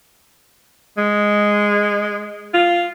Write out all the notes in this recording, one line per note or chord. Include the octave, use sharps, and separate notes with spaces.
G#3
F4